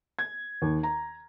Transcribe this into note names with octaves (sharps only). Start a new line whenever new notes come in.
G#6
D#2
A#5